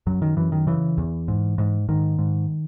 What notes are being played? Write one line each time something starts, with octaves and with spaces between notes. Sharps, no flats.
F#2 F#3
D#3
F#2 E3
D#3
C#3 E3
E2
G#2
G#2
G#2 D#3
G#2